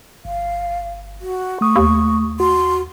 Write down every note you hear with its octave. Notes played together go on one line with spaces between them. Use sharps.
G1 F5
F#4
A3 C#6 D#6
D#2
F#4 C6